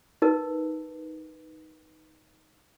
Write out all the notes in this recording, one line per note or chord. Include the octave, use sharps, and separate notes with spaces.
D#4 A#4 B4